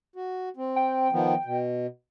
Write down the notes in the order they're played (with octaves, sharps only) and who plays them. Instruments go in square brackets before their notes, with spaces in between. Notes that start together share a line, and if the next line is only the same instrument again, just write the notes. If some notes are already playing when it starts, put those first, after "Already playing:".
[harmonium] F#4
C4
[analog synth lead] G5
[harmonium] D#3 F3 B3
B2